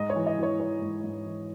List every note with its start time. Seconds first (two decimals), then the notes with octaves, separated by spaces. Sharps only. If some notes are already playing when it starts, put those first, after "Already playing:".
Already playing: G#2 D#5
0.10 C#5
0.16 E3
0.26 D#5
0.38 E3 C#5
0.59 E3 C#5
0.82 G#2
1.04 G#2
1.26 E3